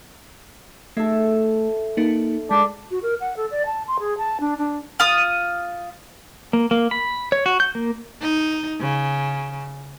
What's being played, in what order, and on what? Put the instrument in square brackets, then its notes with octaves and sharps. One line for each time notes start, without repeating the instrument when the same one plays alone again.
[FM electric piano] A3 [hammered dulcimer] A4 E5
[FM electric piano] A#3 D#4
[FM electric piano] G#3 [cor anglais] D4
[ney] F#4
A#4
F#5
A4
D5
A5
C6
G#4
A5
D4
D4
[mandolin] F4 D#6
[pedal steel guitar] A#3
A#3
B5
C#5
F#4
G6
A#3
[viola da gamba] D#4
C#3